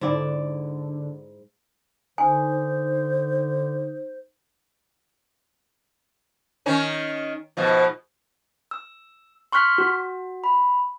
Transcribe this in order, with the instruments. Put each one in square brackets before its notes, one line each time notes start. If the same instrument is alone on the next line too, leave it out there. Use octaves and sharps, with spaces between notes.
[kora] G#2 E4 D5 [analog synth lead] D3
[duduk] D3 [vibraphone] D#4 [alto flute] C5 [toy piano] G#5
[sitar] D#3 C#4 D#4
G#2 B2 F3
[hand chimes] E6
C6 C#6 F6 F#6 B6
F#4
B5